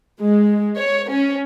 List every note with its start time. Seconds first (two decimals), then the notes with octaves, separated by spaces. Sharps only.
0.20 G#3
0.78 C#5
1.10 C#4